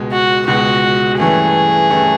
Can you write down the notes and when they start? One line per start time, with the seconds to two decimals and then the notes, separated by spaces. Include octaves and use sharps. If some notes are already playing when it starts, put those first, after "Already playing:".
Already playing: C#2 B2 G#3
0.12 F#4
0.47 C#2 B2 G#3 F#4
1.19 G2 E3 A3 C#4 G#4
1.90 G2 E3 A3 C#4